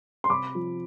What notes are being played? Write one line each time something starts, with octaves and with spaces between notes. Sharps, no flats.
C6
C3 B5 D6
F3